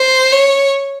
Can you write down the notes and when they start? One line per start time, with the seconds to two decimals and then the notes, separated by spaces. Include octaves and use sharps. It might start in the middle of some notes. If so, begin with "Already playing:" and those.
Already playing: C5
0.32 C#5